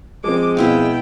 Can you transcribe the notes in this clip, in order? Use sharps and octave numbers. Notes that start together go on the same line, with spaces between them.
F3 G#3 C4 D6
B2 E4 F5 G5